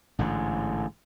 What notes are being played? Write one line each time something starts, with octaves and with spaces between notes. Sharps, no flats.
A1 G#2 D3